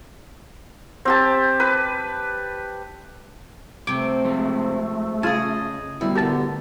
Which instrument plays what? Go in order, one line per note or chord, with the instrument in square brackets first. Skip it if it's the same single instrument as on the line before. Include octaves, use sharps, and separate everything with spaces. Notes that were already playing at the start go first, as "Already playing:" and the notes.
[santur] C4 G4 A5
B4
[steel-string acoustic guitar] C3 C4 [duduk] A3 [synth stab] D6
[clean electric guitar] F3 G#3 C5
[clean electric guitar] C#3 [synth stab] F4 A5 [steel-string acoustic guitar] G#4 D#5
[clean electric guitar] D2 B2 [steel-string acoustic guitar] G3 [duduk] E4
[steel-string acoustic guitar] A2 B3 [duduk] D3 [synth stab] G4 A#4 A5